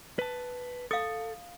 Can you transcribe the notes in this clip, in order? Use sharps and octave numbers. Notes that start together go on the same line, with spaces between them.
B4 A5
A4 F5 D#6